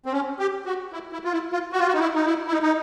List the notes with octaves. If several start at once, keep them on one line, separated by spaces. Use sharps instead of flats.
C4
C#4
G4
F#4
E4
E4
F4
E4
F4
F#4
F4
F#4
D#4
E4
D#4
E4
E4
D#4
D#4